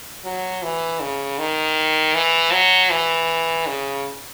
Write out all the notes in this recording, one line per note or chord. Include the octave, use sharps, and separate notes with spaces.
F#3
E3
C#3
D#3
E3
F#3
E3
C#3